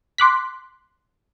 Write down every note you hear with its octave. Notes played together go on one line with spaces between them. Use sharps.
C6 D6 F#6 B6